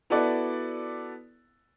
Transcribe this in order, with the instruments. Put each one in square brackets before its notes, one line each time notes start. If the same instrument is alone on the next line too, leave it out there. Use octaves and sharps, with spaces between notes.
[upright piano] B3 E4 F#4 A4 B4 D5